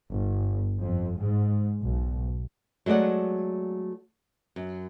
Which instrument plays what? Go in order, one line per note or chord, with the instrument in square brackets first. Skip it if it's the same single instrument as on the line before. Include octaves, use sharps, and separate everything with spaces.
[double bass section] G1
F2
G#2
B1
[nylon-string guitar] F#3 G#3 A3 D5 F#5
F#2